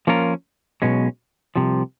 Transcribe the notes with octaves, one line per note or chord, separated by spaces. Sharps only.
F3 A#3 C#4 F4 A#4
B1 B2 G#3 C#4
C2 C3 F3